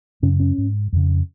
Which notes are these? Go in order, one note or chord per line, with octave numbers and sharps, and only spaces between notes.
F#2 C#3 C#4
C#4
G#2
F2 C#3